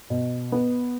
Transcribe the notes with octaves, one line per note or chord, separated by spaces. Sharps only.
B2
B3